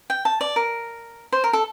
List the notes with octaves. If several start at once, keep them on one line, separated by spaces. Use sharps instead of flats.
G5
A5
D5
A#4
C5
A#4
A4